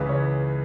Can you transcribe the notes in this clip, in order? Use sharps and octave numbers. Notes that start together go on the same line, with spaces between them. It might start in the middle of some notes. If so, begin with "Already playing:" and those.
Already playing: C#2 C#3 E3 B4
C#5